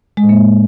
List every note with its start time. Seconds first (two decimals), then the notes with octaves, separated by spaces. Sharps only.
0.17 G#3
0.23 A2
0.29 A#3